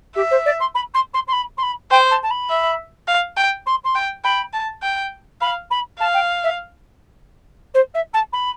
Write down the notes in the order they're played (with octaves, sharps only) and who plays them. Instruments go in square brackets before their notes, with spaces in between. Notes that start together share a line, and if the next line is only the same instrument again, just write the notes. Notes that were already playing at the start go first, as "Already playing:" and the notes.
[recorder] G4 [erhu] E5
[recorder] C5
D5
C6
B5
C6
C6
C6
B5
C6
B5
[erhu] C5 [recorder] G5
[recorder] A5
A5
B5
[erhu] E5
F5
G5
[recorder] C6
C6
[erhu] G5
[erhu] G5 [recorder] B5
[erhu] A5
G5
[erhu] F5 [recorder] B5
[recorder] B5
[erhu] F5 [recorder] A5
[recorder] G5
E5
C5
E5
A5
B5